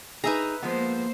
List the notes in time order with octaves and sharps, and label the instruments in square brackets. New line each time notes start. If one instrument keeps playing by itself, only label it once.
[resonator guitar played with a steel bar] D#4 G#4 [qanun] B4 E5 A#5
[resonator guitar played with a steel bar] F3 G#3 B3 [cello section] A#3 C5